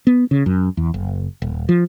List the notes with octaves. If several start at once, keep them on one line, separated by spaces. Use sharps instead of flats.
B3
C#3
F#2
E2
F#1
D#1
F3